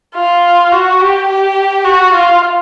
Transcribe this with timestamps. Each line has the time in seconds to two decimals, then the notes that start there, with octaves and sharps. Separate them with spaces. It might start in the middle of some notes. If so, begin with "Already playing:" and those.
0.15 F4
0.72 F#4
1.01 G4
1.29 G4
1.85 F#4
2.14 F4